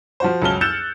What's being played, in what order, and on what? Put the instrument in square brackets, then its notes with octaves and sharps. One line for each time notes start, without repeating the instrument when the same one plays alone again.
[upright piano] F3 F#4 C5
C#2 F#2 F#3 A5 F6 G7
E6 F#6 G6 A6 C#7 E7